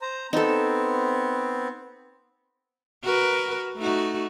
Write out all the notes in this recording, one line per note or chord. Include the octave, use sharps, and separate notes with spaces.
C5 A#5
B3 C4 D#4 A4
F#4 A#4 B4
A3 D#4 F#4